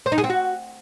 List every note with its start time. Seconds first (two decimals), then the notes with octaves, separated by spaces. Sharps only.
0.06 C5
0.12 D#4
0.18 G#4
0.24 C4
0.30 F#4